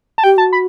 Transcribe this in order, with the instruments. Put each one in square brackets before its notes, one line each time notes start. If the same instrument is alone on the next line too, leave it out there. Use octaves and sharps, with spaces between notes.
[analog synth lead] A5
[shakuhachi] G4 [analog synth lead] G5
[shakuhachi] F#4 [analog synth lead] A5
[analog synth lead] B5